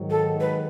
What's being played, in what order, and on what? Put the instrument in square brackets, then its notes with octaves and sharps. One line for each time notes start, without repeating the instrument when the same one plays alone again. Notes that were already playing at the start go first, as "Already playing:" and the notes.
Already playing: [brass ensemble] G#2 D#3 F#3
[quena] A4
B4